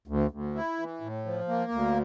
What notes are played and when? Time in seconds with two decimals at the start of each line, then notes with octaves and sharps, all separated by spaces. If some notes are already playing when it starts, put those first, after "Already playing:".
0.08 D2
0.31 D2
0.55 E4
0.78 E3
1.01 A2
1.26 F3
1.48 A#3
1.71 D2